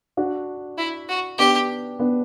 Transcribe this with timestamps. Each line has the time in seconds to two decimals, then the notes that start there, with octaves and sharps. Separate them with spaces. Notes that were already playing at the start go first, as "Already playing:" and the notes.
0.17 D4 F#4
0.78 E4
1.09 F#4
1.39 B3 D4 G4
1.99 B3 D4